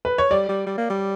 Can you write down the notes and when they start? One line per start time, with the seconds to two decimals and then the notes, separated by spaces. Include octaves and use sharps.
0.05 B4
0.18 C#5
0.31 G3 D5
0.49 G3
0.67 G3
0.78 A#3
0.90 G3